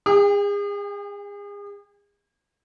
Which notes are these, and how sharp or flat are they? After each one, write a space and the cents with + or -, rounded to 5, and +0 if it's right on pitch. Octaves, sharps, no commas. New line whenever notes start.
G#4 -35 G5 +30